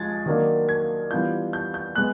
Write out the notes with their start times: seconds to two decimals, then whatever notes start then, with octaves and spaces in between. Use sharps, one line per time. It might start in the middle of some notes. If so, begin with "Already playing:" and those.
Already playing: F3 G#3 G#6 A6
0.26 D#3 F#3 A#3 D4
0.69 G#6
1.11 E3 G3 B3 D4 F4 G6
1.53 G6
1.74 G6
1.96 G#3 B3 F#6